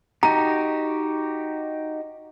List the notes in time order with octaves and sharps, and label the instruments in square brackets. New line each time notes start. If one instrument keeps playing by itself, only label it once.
[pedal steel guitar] D#4 F#4 G4 [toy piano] A#5